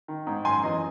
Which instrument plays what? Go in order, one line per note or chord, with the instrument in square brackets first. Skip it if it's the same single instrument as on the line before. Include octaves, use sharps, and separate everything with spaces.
[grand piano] D#3
G#2
F#2 G#5 C6
E3 D#5